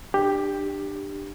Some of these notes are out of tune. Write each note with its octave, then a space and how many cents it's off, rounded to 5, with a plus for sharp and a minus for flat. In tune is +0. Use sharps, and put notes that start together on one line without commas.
D4 +30 G4 +10